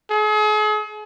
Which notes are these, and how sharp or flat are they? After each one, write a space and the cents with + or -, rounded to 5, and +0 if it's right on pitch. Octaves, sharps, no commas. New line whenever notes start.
G#4 +40